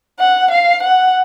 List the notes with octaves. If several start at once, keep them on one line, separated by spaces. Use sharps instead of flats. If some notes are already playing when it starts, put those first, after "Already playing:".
F#5
F5
F#5